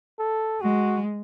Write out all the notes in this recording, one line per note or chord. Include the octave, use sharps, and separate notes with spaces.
A4
G#3 F#4